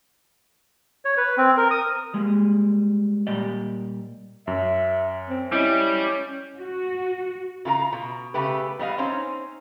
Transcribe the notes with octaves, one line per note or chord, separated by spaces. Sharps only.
C#5
B4
C4
A#4
D#6
G3 G#3 A#3
A#2 G3 G4 D5 D#5
F#2 E5
C4
G3 C#4 E4 D#5
F#4
C#3 F4 A4 A#5
B2
C#3 A3 G4 B4
G3 B3 D#5 F5
C4 C#4 D#4 C5